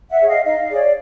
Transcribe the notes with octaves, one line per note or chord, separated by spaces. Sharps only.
E5 F#5
G#4 C#5
D#5 F5
D#4 D#5 F5
G#4 C#5 D5